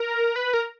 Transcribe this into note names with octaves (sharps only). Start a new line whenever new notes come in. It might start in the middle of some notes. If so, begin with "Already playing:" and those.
Already playing: A#4
B4
A#4